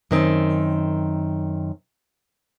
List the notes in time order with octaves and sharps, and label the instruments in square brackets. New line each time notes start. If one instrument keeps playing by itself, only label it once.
[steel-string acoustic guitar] F#2 D#3 C4